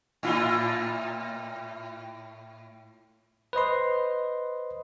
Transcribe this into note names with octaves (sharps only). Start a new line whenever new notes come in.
A2 E4 F4
B4 C5 D#5 C6